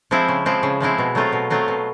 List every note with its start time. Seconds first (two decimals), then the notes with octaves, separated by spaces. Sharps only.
0.11 F3 G#3 C4 E4
0.28 C#3
0.46 F3 G#3 C4 E4
0.63 C#3
0.80 F3 G#3 C4 E4
0.98 B2
1.15 F#3 A3 C4 F4
1.33 B2
1.50 F#3 A3 C4 F4
1.68 B2